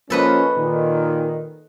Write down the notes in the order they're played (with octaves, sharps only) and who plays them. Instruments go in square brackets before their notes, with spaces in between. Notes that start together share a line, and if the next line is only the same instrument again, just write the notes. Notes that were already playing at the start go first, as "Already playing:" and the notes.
[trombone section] F3 A#3 C#4 [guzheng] A4 B4 D#5
[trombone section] A#2 D#3